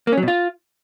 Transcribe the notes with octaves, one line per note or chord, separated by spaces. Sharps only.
A#3
C#4
F#3
B2
F4